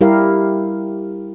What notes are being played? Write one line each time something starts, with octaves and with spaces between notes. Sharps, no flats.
G3 E4 G4 A#4 F5